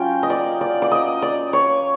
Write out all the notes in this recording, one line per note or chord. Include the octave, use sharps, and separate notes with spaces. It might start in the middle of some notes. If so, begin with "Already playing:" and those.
Already playing: F#3 C#4 F4 G5
D#5
D5
D5
D5
D#5
D5
C#5